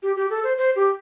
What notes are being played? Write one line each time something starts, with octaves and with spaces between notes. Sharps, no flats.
G4
G4
A4
C5
C5
G4